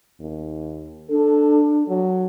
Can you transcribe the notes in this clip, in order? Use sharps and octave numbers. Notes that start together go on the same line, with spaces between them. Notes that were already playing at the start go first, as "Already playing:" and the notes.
D#2
D4 A4
F#3